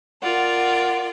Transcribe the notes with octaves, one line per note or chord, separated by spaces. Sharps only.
F4 A#4 D5 F#5